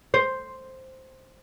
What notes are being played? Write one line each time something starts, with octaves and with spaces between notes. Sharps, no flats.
C5